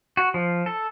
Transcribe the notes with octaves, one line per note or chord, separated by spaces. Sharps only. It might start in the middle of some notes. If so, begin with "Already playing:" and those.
F#4
F3
A4